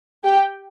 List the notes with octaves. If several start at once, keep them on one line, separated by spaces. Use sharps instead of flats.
G4 G5